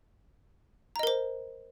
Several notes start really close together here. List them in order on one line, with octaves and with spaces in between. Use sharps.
A#5 D#5 A#4 C5